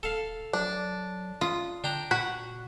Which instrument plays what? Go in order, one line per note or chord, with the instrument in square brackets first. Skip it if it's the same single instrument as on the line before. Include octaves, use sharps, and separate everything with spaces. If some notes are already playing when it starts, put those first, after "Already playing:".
[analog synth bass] D#1 [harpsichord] A4 F5
[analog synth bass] F#3 [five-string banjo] D4
[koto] F4 [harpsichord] D#6
[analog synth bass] D3 [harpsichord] D4 G5 A#5
[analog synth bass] A#2 [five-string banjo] F#4 F#5 B5